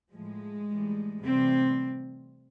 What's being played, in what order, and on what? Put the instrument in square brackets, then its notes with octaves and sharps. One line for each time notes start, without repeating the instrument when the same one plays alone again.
[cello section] A2 F3 G#3
A2 E3 G3
A2 C3 E3 G3 C4